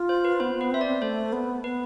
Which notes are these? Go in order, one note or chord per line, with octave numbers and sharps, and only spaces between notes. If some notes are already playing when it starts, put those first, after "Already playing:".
Already playing: F4
C5
B4
B3 C5
B3
B4
C4 E5
D5
C4
A3 C5
B3
B3 B4